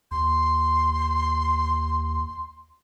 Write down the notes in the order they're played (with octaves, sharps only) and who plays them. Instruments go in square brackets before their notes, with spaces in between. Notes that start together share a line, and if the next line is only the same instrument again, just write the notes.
[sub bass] D#2 [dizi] C6